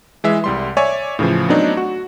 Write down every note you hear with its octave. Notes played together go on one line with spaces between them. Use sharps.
E3 G#3 E5
C2 G3 C6
C#5 D5 E5 G#5
A2 C#3 E3 F3
F#3 A3 B3 C4 D4 D#4
F#4